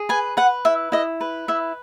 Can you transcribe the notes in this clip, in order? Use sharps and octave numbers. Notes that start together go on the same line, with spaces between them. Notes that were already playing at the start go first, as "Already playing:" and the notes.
Already playing: G#4
B4 G#5
B4 F#5
E4 E5
E4 D#5
B4
E4 E5